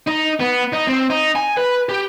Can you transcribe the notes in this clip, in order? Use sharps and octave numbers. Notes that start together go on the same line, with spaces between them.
D#4
B3
D#4
C4
D#4
G#5
B4
G4